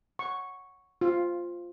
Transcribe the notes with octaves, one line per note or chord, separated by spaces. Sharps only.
C#6
F4